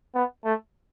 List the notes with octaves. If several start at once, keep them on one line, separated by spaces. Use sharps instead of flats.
B3
A3